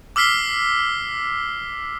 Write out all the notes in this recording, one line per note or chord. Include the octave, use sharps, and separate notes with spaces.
D6 E6 F6 B6 C7 G7